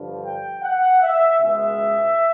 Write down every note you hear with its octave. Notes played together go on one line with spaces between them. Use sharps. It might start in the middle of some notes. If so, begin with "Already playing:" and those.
Already playing: G2 D3 F3
G5
F#5
E5
C#2 B2 G#3 E5